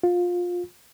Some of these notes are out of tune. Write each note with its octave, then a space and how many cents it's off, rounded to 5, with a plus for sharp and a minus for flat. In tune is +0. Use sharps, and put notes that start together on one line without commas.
F4 +20